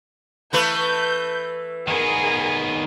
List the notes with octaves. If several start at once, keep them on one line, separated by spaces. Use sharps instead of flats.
E3 A3 B4 G6
D#3 B3 G#4 A#4